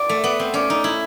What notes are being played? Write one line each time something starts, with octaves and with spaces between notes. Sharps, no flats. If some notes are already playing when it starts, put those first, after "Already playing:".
Already playing: D5
A3
B3
C4
C#4 D5
D#4
E4